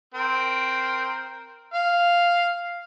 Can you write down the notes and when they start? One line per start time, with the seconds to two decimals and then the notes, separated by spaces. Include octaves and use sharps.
0.14 C4 A#4
1.74 F5